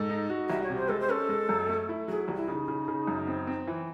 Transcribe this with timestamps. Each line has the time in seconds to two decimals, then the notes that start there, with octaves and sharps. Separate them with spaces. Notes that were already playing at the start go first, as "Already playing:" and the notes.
Already playing: G#2 A4
0.10 D#4
0.30 F#4
0.49 C2 E5
0.63 C#5
0.70 C3
0.76 C5
0.89 G#3 A4
1.00 C5
1.08 C#4 A4
1.29 G#3
1.49 F#2
1.69 A3
1.89 E4
2.08 F#3 G#4
2.28 C2
2.35 E4
2.48 C#3 D#4
2.68 C#3
2.88 C#3
3.07 F#2
3.27 C4
3.47 C4
3.67 E3